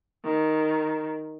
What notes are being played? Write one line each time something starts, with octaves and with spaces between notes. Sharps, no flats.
D#3